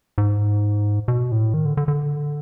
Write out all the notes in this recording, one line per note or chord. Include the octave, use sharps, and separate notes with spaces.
G#2
B2
A2
D#3
D3
D3
D3